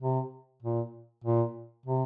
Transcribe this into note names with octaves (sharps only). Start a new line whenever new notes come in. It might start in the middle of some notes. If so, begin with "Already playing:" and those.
C3
A#2
A#2
C3